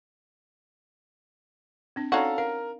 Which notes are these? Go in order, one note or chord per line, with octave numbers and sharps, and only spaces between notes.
C4 D4
C#4 D#4 F#4 A4 D5 F5 A5 A#5
A#4 F5